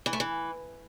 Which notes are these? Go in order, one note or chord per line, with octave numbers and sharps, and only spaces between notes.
E3
A3
E3